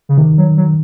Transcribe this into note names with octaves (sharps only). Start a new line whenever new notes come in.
C#3
C3 D#3
F#3
F#3